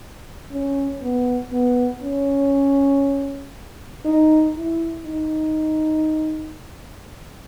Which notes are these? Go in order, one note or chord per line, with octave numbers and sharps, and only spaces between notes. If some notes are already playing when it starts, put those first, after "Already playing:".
C#4
B3
B3
C#4
D#4
E4
D#4